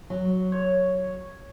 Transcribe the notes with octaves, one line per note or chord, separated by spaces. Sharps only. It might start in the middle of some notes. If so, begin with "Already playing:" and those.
F#3
C#5